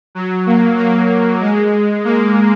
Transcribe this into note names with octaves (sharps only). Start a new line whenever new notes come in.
F#3
A#3
A#3
G#3
A#3